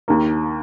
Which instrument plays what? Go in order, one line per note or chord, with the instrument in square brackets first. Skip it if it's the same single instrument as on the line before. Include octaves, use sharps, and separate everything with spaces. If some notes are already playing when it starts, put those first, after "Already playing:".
[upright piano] D#2 D#3 A#3